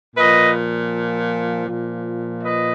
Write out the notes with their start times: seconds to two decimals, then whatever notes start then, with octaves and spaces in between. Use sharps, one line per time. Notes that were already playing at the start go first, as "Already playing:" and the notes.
0.15 A#2 F3 B4 D#5
1.68 A#2 F3
2.44 B4 D#5